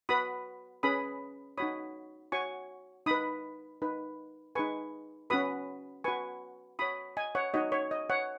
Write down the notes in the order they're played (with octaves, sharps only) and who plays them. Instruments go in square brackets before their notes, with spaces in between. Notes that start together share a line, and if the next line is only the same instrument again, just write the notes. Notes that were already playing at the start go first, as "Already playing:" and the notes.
[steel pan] F#4 B4 B5 D#6
C#4 G#4 B4 B5 D#6
D#4 F#4 C#5 B5 D#6
F#4 C#5 G#5 C#6
D#4 B4 B5 D#6
D#4 B4
D#4 G#4 B4 G#5 C#6
C#4 F#4 B4 B5 D#6
F#4 B4 G#5 C#6
F#4 C#5 B5 D#6
D#5 G#5
C#5 F#5
D#4 F#4 C#5 D#5
C#5
D#5
C#5 F#5